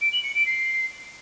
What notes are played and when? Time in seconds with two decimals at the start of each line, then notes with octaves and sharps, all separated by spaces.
0.01 D7
0.12 F#7
0.23 C#7
0.35 D7
0.46 C7